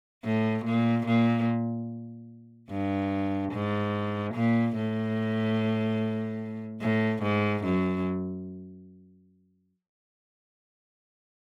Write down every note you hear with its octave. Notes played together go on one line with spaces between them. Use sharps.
A2
A#2
A#2
G2
G#2
A#2
A2
A2
G#2
F#2